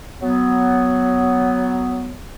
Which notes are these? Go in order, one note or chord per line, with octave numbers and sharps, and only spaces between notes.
F#3 B3